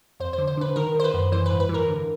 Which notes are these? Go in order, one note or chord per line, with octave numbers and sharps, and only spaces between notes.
F2 C5
D3 C5
C5
D3 B4
D#3 A#4
D#3 C5
B4
F#2
E3 C5
B4
G#2
B4
E3 A#4
D3